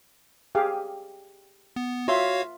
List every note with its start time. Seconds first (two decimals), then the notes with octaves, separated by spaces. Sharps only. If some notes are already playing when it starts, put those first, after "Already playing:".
0.55 G4 G#4 F5
1.76 B3
2.08 F4 F#4 C#5 E5 F5 C6